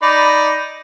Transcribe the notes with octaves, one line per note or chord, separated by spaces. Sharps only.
D#4 D5 B5